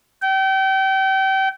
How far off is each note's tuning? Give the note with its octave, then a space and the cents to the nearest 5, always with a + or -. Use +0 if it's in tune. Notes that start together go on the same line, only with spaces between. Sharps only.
G5 -30